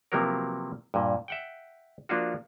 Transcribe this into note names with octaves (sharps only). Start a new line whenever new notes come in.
C3 F3 F#3 A#3 B3 A#4
G2 A#2
E5 F#5 G5
F3 A#3 D4 F4 F#4